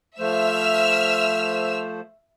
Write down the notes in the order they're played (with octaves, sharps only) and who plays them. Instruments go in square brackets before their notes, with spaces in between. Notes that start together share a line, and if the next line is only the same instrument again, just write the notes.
[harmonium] F3 A3 C5 [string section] E5 E6 F6